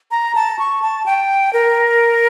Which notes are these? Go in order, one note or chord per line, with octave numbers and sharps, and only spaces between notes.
A#5
A5
C#6
A5
G5
A#4